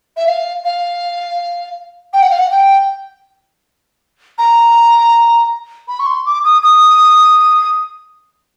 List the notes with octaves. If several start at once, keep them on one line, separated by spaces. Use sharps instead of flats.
E5
F5
F5
G5
F#5
F5
F#5
G5
A#5
B5
C#6
C6
D6
D#6
D#6